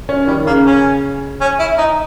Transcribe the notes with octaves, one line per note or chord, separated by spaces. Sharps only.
C#4
D#3 G3
C#3 A#3
C#4
C#4
E4
D#4